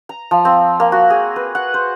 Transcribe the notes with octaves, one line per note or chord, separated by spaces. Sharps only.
A#5
F3
C4
A#3
F#4
G#4
B4
F#5
C5